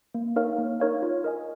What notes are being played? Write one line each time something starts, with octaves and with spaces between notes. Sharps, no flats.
A#3
D#4 A#4 C#5 F5
A#3
D#4 A#4 C#5 F5
F4
A#4 D#5 G#5